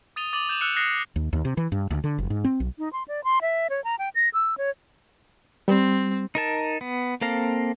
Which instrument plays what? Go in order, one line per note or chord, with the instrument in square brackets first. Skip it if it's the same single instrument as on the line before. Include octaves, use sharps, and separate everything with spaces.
[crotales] D#6 A6 D#7 F7 G7
D6 A6 D#7 F7 F#7
G6 E7 F7
E6 F#6 C#7 E7
D#6 F#6 A6 A#6 C7 C#7
[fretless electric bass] D#2
D#2
C3
E3
G2
D2
D3
F#1
G#2
C4
B1
[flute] D#4
C6
D5
C6
E5
C#5
A#5
G5
A#6
E6
C#5
[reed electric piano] G3 [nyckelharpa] C4
[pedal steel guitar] D#4 A#4 A5
B3
A#3 C4 A4 F5 A#5